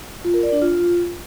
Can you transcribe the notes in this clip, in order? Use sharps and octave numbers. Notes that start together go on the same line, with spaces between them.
F4
A#4
D5
D4
F4